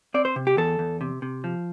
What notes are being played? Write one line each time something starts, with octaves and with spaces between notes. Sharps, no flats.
C4 D5
C5
C3
G4
E2 A4
E2
C3
C3
F3